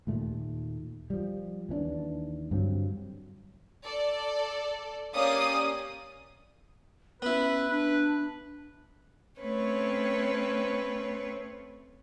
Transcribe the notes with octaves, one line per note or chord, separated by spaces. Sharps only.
D#2 A#2 A3
F3 G3
D#2 E3 C#4 D4
G2 D3 F#3 C4
A4 D5
A#3 C#4 G4 D5 F5 D#6
B3 C#4 E4 B4
D4 B4
A3 C4 C#4 B4 C#5